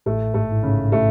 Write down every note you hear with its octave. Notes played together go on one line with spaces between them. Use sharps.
A1 A2 A3
G#2 A3
A2
G#2 C#3
A2 A3